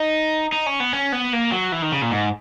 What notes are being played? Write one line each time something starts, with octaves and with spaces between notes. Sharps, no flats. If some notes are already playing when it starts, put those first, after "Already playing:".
Already playing: D#4
D#4
C#4
B3
C#4
B3
A#3
F#3
E3
D#3
C#3
A#2
G#2